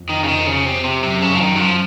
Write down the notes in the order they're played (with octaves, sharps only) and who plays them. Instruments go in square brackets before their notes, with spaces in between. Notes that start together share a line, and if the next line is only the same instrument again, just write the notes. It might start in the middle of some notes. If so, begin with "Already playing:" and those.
Already playing: [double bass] F2
[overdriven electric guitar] D#3
C#3
D#3
C#3
C3
C3
[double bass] F#2 [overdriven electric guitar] C3
[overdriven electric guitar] C#3
F3
D#3
F#3
F3